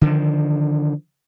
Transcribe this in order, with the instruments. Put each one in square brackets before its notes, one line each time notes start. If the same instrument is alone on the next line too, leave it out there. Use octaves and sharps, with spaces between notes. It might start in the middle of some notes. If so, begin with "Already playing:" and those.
[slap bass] D3 D#3 F3